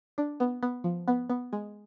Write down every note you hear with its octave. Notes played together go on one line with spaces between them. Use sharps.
D4
B3
B3
F3
B3
B3
G#3